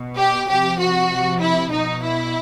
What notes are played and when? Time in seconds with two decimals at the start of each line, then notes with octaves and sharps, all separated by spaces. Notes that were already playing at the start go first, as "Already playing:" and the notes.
Already playing: B2
0.17 G4
0.49 C3 F3 G4
0.79 F#4
1.11 C3 F3
1.41 E4
1.72 B2 D#4
2.03 E4